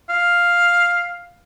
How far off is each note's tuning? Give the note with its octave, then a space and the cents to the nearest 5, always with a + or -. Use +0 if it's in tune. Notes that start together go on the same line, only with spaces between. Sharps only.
F5 +5